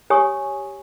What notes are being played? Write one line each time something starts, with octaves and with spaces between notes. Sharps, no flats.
G4 C#5 G#5 C#6 D#6